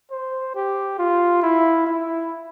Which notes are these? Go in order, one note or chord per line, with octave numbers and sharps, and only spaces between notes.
C5
G4
F4
E4
E4